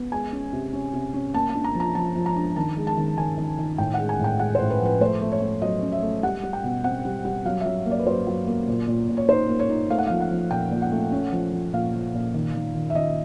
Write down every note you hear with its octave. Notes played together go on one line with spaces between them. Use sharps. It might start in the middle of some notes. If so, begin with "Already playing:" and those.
Already playing: B3
G#3 G#5
C#4
C3
C#4
C3
C#4
A#3 A5
A5
D4
A#5
F3
A#5
F3 A5
F3
A#5
D4
D#3 A5
G#3
A5
D#3
D#3 G#5
D#3
D#3
A2 G5
G#3 F#5
G#5
A2 G5
G#3 F#5
C5
A2
B4
F3 B4
A3 C5
A3
C#5
A3
F#3 D#5
C#4
E5
A3
G3 F#5
G3
G5
B2
C4 F#5
G3
G3
F#3 F5
E5
F#3
A#3
D5
B4
F#3 C5
F#3
A#3
A#2
A#2
A#2
C#5
D#4 C5
A#3
C#5
D#4
A3 F5
F#5
F3 F5
F#5
F3
A#2 G5
A#2
F#5
A3
C#4
F3
F3
A#2 F5
F3
A#2
D#3
D#3
D#3
E5
D#3 D#5